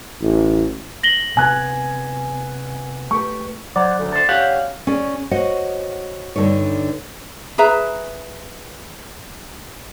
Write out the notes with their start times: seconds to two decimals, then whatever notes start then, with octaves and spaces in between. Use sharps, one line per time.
0.22 A1
1.03 A#6 F#7 G7
1.37 C3 B3 G#5 F#6 G#6
3.11 A3 G4 B4 C#6
3.76 F#3 C5 D5 F#5
4.00 D2
4.12 A4 C5
4.29 C#4 G4 C#5 F5 F#5
4.87 C#4 G#4 D5
5.31 F#4 C5 C#5 D#5 F#5
6.36 G2 D3 D#4 C#5
7.58 G#4 B4 E5 A#5